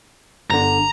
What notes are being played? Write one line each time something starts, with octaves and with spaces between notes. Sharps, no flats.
G1 D3 A#5